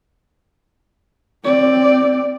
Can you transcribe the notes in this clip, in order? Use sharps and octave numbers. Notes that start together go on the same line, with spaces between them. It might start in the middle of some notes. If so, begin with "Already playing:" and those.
C4 D5